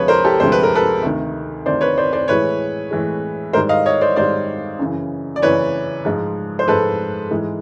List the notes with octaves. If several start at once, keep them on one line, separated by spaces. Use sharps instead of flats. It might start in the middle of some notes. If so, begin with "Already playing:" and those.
Already playing: D2 C3 F3 G#3 B4 C#5
A#4 C5
G4 A4
D2 C3 F3 G#3 C5
B4
A#4
A4 B4
D2 C3 D#3
D2 C3 D#3 C5 D5
B4 C#5
C5 D5
C5 D5
A2 E3 G#3 B4 C#5
A2 E3 G#3
G#2 D#3 G3 A#4 C5
D#5 F5
C#5 D#5
C5 D5
G#2 D#3 G3 C5 D5
F#2 C#3 E3
D5
F#2 C#3 E3 B4 C#5
G#2 F3 G#3
C5
G#2 F3 G#3 A4 B4
G#2 E3 G#3